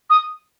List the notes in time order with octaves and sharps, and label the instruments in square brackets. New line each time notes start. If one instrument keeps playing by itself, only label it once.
[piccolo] D#6